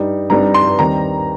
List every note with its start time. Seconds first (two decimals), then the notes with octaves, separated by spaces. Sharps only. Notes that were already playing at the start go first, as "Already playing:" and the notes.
Already playing: G2 G3 D#4
0.30 G2 G3 C4 D#4 A#5
0.54 C6
0.79 D#2 D#3 G3 C4 A#5